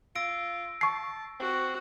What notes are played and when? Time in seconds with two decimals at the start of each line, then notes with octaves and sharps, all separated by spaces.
0.15 F4 E6 A#6 D7
0.81 A5 C#6 C7
1.40 C4 F#4